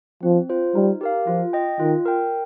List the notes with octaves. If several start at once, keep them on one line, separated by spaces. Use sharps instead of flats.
F3 C4
F4 C5
G3 D#4
G4 A#4 F5
F3 F4
D#5 G5
D#3 F4
A#4 G5